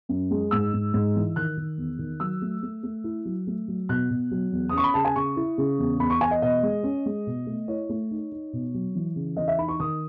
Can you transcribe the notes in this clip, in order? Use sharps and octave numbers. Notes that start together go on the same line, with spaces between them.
F#2
G#3
G#2 E6
G#2
G#2
E3
D#3 F#6
D#3
E2
D#3
F#3 E6
A3
A3
A3
E4
F#3
A3
F#3
B2 F#6
B2
F#3
E2
D#6
C#4 C#6
B5
C#3 A5
G#5
C#3 C#6
E4
C#3
E2
E2 B5
C#6
E2 G#5
D#5
B2 D#5
G#3
C#4
G#3
B2
A3
E4 C#5
A3
D#4
D#4
B2
F#3
E3
C#3
E3 D#5
E5
D#4 B5
C#6
D#3 D#6